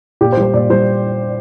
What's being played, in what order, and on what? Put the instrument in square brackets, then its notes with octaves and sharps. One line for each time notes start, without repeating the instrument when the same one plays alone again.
[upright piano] A#2 G4
C5
G3
C5
A#2 D5
G3 C5